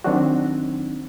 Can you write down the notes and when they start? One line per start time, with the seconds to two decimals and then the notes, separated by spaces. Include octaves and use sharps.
0.04 D#3 F#3 C4 D4 D#4 F#4